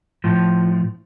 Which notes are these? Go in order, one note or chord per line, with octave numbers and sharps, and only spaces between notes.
A2 F3